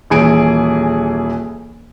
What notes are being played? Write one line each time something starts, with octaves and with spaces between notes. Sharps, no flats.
D#1 E3 G#4 D7